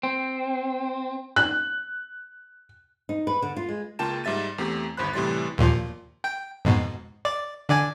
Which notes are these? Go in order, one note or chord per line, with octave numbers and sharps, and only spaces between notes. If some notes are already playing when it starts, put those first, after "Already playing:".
C4
F#6
D#4
B4
D3
F4
G#3
C#2 A#3 F4 G5 A5 E7
G#2 G3 E5 A6 D#7
E2 A3 C4 G4
G1 D#2 C5 B5 F#6
A2 C3 E3 G3 C6 A6
D#2 A#2 F3
G5
F2 G#2 B2
D5
D3 D5 G#5